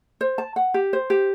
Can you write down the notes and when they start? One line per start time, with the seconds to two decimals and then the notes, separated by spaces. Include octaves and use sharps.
0.21 C5
0.38 A5
0.56 F#5
0.74 G4
0.93 C5
1.10 G4